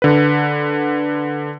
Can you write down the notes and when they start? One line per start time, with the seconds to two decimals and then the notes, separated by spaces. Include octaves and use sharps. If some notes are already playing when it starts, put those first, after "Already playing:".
0.02 D3 B4